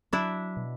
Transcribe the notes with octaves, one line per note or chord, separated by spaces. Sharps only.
F#3 D4 E4
B2